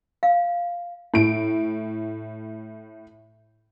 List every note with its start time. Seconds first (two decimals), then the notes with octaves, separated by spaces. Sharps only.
0.23 F5
1.14 A2 D7